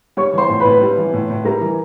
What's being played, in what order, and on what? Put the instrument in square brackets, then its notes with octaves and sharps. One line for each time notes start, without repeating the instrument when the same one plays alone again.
[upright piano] G3 [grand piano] C#5 C#6
[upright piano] E3 [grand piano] C5 C6
[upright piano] A2
[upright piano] A2 [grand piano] B4 B5
[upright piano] G3
E3
A2
A2
[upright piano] G3 [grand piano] A#4 A#5
[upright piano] E3